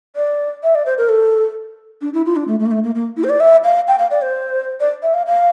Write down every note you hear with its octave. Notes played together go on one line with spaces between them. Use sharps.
D5
E5
D5
C5
A#4
A4
D4
E4
F4
D4
A3
A3
A#3
A3
A#3
A#3
E4
C5
D5
E5
F5
G5
F5
D5
C5
D5
E5
F5
F5